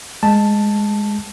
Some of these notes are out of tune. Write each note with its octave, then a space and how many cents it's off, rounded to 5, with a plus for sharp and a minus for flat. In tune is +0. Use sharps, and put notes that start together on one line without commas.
G#3 -5 A5 +0